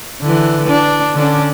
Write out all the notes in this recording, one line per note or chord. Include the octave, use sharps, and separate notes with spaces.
D3 E3
D4
D3 C#4 D4